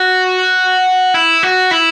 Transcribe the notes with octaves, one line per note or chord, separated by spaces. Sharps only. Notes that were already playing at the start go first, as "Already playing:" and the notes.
Already playing: F#4
E4
F#4
E4